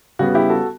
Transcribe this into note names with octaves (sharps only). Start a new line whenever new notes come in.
C#3 G3 B3 F#4
E4 G4
F#4 A4